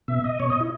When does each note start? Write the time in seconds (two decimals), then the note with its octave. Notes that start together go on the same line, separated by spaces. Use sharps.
0.08 B2 E5
0.24 D#5
0.40 B2 C#5
0.50 D#5
0.60 E4